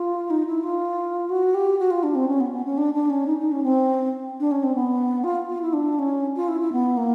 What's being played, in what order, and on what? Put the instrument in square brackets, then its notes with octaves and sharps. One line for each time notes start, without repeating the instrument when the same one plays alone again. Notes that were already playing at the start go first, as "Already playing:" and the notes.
Already playing: [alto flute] F4
D#4
E4
F4
F#4
G4
F#4
F4
D4
C4
C#4
B3
B3
C#4
D4
D4
C#4
D#4
D#4
C#4
C4
D4
C#4
C4
B3
F4
F4
E4
D4
C#4
F4
E4
E4
B3
A#3